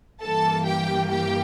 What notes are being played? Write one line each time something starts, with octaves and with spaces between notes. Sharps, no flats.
G2 E3 A#3 A4 A5
G4 G5
G4 G5